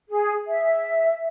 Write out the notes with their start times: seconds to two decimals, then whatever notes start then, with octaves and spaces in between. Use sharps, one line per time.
0.09 G#4
0.47 E5